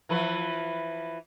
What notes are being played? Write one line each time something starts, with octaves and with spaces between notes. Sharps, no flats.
E3 F3 B4